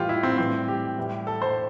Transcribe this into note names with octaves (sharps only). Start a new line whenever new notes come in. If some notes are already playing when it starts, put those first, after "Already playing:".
Already playing: A2 E3 G3 F4 G4
E4
C4
A2 E3 G3 C4
G4
A2 E3 G3
A4
C5